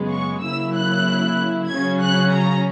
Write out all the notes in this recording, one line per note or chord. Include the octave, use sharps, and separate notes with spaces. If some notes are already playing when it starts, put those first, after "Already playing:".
Already playing: F#2 C#3 G#3 B3
C#6
C#3 F#3 A#3 E4 E6
F#6
C#3 F#3 C#4 G#6
F#6
A#5